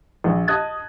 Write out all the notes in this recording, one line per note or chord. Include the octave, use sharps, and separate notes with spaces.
A#1
D#5 A5 D#6 F#6 G#6 A6